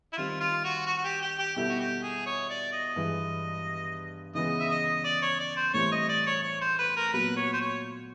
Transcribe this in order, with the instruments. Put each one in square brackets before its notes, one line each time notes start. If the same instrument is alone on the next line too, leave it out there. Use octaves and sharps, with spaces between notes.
[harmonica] E4
[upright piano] D#3 G3 C4 D#4 [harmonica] F4
[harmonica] F4
F#4
F#4
F#4
G4
G4
G4
[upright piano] B2 G3 B3 E4 A4 [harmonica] G4
[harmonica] F#4
G4
G#4
C#5
D5
D#5
[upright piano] G2 E3 G#3
[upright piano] C#3 E3 G#3 B3 [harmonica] D#5
[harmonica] E5
D#5
D5
C#5
D5
C5
[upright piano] A2 E3 G3 C4 [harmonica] C#5
[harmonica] D#5
D5
C#5
C#5
C5
B4
A#4
[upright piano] A#2 F#3 B3 [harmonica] B4
[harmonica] C#5
C5
C#5